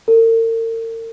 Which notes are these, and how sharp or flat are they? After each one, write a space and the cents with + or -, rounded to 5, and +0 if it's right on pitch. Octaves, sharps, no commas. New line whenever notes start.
A#4 -45